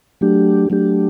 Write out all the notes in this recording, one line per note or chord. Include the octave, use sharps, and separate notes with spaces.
F#3 A3 D4 G4
F#3 A3 D4 G4